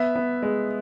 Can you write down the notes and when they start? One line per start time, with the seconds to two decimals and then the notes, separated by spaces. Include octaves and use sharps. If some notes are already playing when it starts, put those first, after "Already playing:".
Already playing: B3 E5
0.15 B3
0.42 G#3